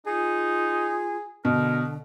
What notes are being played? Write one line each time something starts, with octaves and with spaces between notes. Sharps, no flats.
D#4 F4 G#4
B2 D3 A#4